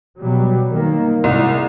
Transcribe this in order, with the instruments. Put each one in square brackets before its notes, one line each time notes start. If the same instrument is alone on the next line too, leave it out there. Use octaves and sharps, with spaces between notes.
[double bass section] B2 F#3 G3
D#3 A#3
[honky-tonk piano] C2 [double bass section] G#3